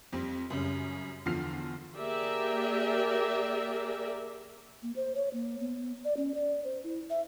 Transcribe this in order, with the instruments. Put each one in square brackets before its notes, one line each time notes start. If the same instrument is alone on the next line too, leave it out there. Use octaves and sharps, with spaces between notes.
[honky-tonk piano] F2 G3 C4
F#2 C#3 G3 C#4
E2 D3 F3 F6 C7
[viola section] A#3 G4 G#4 A#4 D5 E5
[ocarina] A#3
C5
C#5
A#3
B3
D5
C#4
D5
C5
E4
E5